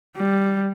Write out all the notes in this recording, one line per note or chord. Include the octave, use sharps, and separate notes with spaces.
G3